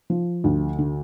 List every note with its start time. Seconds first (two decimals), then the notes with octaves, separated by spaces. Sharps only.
0.10 F3
0.44 D2
0.79 D3